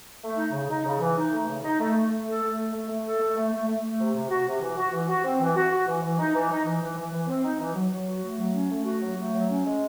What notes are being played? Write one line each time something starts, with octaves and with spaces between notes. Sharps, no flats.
A3
D#4
C#3
D#4
C#3
E3
D#4
A3
C#3
D#4
A3
A3
A3
A4
A3
A4
A3
A3
A4
A3
A3
A3
A3
A3
C3
C3
F#4
C3
E3
F#4
E3
F#4
C4
E3
F#4
F#4
E3
E3
D#4
E3
D#4
E3
E3
E3
E3
C4
D#4
E3
F#3
F#3
F#4
A3
F#3
C#4
A3
F#4
F#3
A3
F#3
C#4
G#3